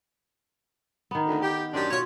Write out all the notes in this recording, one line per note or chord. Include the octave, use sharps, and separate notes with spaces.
D#3 B3
D2
G4
F#2 C4 D4 G4 D5
B2 F4 C#5